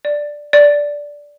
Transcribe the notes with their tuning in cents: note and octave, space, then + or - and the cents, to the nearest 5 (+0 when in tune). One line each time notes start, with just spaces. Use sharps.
D5 +0
D5 -10